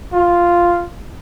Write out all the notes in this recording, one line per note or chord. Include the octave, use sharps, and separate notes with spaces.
F4